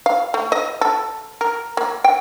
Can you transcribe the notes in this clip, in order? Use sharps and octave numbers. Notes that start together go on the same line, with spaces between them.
F5
A3
D#5
A4
A#4
A#3
G5